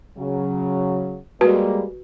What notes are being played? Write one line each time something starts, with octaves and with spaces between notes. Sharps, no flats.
C#3 F#3
G3 G#3 A#3 F#4 B4